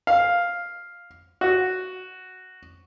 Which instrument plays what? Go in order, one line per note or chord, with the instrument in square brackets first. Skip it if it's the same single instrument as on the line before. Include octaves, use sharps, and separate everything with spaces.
[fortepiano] F5
F#4